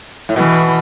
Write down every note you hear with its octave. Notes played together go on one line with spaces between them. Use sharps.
A2
B2 E3